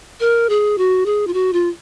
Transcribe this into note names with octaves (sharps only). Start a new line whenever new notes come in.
A#4
G#4
F#4
G#4
F4
F#4
F4